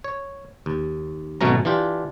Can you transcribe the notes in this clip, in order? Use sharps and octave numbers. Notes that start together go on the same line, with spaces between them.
C#5
D#2
G#1 B2 F#3 A3 C#4 A#5
E3 D4 F4 G4